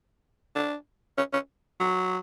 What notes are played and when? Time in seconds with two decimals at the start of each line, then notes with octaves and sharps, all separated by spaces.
0.56 D4
1.18 C#4
1.33 C#4
1.80 F#3